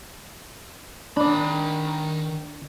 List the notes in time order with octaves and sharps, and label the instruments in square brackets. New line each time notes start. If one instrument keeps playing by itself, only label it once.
[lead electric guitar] D#3 B5 [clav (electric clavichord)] D4 D5